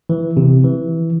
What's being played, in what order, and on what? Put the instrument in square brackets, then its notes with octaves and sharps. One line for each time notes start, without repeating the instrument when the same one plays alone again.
[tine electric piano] E3
C3
E3